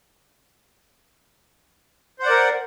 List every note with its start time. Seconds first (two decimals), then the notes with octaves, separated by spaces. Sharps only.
2.19 C5
2.23 F#5
2.26 D5
2.29 A#4